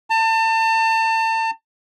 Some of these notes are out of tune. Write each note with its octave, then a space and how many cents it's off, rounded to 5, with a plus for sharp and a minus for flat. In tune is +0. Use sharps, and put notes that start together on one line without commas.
A5 +35